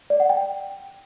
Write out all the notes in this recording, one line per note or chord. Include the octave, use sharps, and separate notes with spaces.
D5
F#5
G5